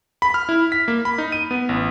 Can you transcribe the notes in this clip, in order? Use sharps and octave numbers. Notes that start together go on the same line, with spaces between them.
B5
F6
E4
B6
A#3
B5
D#4
D#7
B3
A1